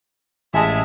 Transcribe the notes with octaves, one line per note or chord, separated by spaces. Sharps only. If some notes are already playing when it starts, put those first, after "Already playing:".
A1 G#3 E5 G#5 A5